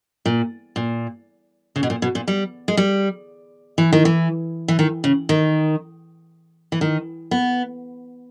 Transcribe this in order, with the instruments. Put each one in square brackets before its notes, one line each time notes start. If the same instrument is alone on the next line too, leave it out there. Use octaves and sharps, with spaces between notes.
[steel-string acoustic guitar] A#2
A#2
C#3
B2
A#2
B2
A#2
G3
G#3
G3
E3
D#3
E3
E3
D#3
C#3
D#3
E3
D#3
B3